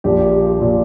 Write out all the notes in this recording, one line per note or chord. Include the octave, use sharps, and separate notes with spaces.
A#1 A#2 F3 G4
A#2 F3